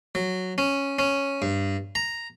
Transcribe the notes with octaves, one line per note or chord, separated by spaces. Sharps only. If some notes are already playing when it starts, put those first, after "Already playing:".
F#3
C#4
C#4
G2
A#5